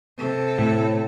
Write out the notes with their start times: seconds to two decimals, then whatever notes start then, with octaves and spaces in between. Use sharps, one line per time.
0.18 C3 A4
0.58 A2